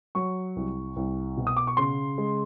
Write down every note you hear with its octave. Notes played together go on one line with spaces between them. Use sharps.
F#3 C#6
C2
C2
B2
D#6
D6
C#6
C#3 C6
G#3